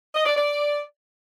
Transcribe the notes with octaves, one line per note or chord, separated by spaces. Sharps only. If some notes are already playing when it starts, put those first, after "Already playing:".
D#5
D5
D5